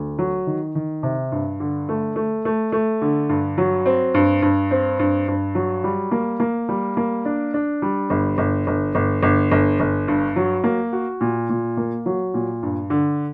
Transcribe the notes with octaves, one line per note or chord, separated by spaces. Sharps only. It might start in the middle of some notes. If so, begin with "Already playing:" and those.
Already playing: D2
F#3
D#3
D#3
C3
G2
D3
A3
A3
A3
A3
D3
G2
F#3
C4
G2
G2
C4
G2
G2
F#3
G3
A#3
A#3
G3
A#3
D4
D4
G3
G1
G1
G1
G1
G1
G1
G1
G2
F#3
A#3
F#4
A#2
A#2
A#3
F#3
A#2
G2
D3